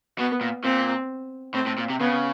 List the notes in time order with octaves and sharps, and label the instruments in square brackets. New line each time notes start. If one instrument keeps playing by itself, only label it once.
[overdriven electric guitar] B2 [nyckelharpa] B3
[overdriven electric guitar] A#2
[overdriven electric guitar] A#2 [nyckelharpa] C4
[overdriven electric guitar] A2 [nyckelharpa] C4
[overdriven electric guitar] A2
A#2
C3
[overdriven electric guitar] C#3 [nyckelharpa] B3